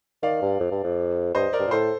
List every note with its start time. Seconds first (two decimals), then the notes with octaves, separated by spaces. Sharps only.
0.23 D#3 D5 F5
0.42 G2
0.60 F2
0.71 G2
0.84 F2
1.35 G2 C5 D#5
1.53 A#4 D5
1.59 G2
1.67 A#2
1.71 A2 A4 C5